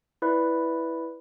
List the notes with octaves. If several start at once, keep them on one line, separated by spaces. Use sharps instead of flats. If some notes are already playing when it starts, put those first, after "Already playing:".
E4 B4 D5 E5 B5 F#6